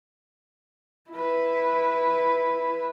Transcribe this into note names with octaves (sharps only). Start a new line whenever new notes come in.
E4 B4